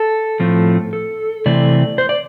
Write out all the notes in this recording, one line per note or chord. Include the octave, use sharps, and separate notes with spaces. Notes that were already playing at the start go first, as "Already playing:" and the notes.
Already playing: A4
A2 F3 A3 C4
A4
C3 E3 A3 C4 D5
C5
D5